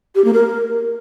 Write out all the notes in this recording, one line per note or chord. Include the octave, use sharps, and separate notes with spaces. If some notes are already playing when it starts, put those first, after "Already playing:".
G4
A#3
A#4